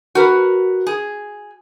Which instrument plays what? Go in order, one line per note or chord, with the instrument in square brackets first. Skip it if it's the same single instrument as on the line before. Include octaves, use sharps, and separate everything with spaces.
[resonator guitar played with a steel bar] F#4 A#4 B4
G#4